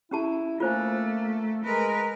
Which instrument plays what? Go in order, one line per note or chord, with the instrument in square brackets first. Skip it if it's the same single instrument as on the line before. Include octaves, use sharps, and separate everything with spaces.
[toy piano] C#4 G4 A5 [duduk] E4
[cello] A3 [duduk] A#3 [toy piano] F4 C5 G#5
[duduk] G#3 [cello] A#4 B4